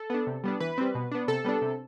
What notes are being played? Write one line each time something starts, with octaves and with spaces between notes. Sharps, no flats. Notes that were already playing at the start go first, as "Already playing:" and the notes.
Already playing: A4
B3 D4
C3
G3 B3 D4
E3 B4
G3 C4
B2
B3 D4
C3 A4
G3 B3 D4
C3